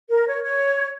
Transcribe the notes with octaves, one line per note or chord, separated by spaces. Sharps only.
A#4
C#5
C#5